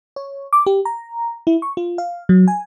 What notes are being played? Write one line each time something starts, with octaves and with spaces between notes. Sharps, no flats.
C#5
D6
G4
A#5
E4
C#6
F4
F5
F#3
G#5